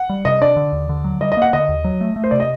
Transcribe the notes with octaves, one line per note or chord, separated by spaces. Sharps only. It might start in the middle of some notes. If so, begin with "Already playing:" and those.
Already playing: F#5
G3
C3 D#5
D4 D5
D3
D#2
D3
F#3
G3 D#5
D#5
A#3 F#5
D3 D#5
D#2
F#3
A3
A3
C5
C3 D5
D#5